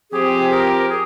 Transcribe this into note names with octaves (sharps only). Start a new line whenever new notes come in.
F3 C4 G4 G#4
A#4
G#4